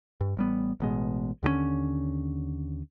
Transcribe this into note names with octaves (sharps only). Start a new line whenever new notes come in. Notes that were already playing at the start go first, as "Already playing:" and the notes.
G2
A1 G3 B3
A1 B2 G#3
D#2 D3 F#3 C#4